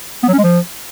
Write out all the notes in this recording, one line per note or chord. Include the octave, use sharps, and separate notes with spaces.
B3
F#3
C#4
G#3
F3